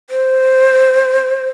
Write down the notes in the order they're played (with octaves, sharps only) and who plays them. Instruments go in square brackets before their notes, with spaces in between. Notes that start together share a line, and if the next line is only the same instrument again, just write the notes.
[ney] C5